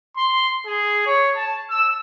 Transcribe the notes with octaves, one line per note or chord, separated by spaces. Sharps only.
C6
G#4
C#5
A5
E6